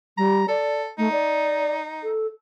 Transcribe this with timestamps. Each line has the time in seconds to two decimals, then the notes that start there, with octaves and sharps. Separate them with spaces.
0.18 G3 A#5
0.48 A4 D5
0.98 A3 D#4
1.12 D5
2.03 A4